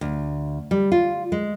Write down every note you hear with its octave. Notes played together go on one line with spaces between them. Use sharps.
D2
G3
F4
G#3